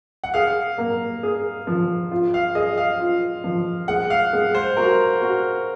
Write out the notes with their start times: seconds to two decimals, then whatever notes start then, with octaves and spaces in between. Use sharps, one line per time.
0.24 F#5
0.34 G#4 F5
0.78 A#3
1.23 G#4
1.67 F3
2.12 F4
2.34 F5
2.55 G#4 D#5
2.78 F5
3.00 F4
3.44 F3
3.88 G#3 F#5
4.10 F5
4.33 G#3
4.55 C5
4.77 F#4 A#4
5.22 F#4